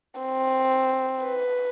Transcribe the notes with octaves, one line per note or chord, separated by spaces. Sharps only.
C4
B4